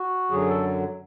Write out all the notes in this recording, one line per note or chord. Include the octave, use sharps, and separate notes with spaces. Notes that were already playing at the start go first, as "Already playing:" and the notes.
Already playing: F#4
F#2 D3 F#3 G#4
A4